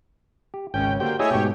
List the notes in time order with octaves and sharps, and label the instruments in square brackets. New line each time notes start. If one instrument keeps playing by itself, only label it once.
[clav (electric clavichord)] G4
[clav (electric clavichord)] G#1 [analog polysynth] C#2 C#4 [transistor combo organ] G5
[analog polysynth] D3 A#3 [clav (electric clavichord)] F#4 G4 C5 [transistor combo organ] G5
[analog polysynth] A3 C#5 [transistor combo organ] E4 G#4 D#5
[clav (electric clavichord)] G#2 B2 [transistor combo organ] G4